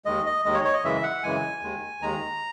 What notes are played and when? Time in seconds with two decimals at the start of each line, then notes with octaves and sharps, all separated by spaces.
0.05 D#2 D#3 G#3 D#5
0.26 D#5
0.45 D#2 D#3 G#3 D#5
0.54 C#5
0.64 C#5
0.74 D#5
0.83 F#2 C#3 E3 G#3 E5
1.03 F#5
1.23 F#2 C#3 E3 G#3 G#5
1.62 D#2 D#3 G#3
2.01 D#2 D#3 G#3 A#5